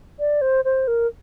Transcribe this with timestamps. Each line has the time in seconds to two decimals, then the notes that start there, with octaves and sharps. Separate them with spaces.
0.19 D5
0.41 C5
0.65 C5
0.87 A#4